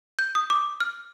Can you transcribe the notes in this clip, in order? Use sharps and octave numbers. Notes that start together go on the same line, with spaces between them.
G6
D#6
D6
F6